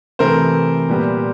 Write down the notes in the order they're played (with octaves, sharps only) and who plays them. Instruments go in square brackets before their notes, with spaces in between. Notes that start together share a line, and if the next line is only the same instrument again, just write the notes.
[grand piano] C3 E3 A3 A#4 C5
A#2 G3 B3